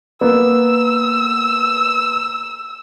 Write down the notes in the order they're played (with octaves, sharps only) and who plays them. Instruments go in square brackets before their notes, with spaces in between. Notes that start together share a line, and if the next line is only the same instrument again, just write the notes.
[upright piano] A#3 B3 [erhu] E6